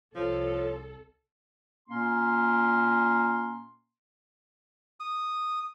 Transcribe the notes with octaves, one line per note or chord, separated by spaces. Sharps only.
C2 F3 A4 C#5
A#2 A#3 C#4 C6
D#6